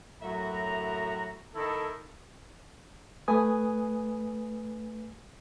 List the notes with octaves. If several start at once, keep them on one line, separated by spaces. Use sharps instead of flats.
F#2 A2 F#4 E5 A#5
D#3 E4 A4
A3 B4 G#5 D#6